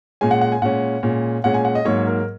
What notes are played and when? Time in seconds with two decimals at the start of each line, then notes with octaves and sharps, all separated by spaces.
0.21 A#2 G#3 C#4 G#5
0.31 F#5
0.41 F#5
0.52 G#5
0.62 A#2 G#3 C#4 F#5
1.03 A#2 G#3 C#4
1.44 A#2 G#3 C#4 F#5
1.54 G#5
1.65 F#5
1.75 D#5
1.85 G#2 F#3 A#3 C#5
2.07 A#4